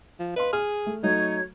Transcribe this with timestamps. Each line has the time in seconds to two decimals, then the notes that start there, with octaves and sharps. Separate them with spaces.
0.19 F3
0.36 B4 D#5 F5 C6
0.53 G#4 F6
0.86 A3
1.03 F#3 A3 D#4 C#5 G#6